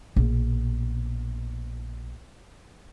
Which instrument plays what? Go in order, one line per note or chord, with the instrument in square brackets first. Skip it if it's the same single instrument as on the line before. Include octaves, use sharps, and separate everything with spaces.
[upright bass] A#1 B2